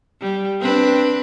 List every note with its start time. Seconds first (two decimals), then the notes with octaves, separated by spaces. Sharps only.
0.21 G3
0.60 C4 D4 B4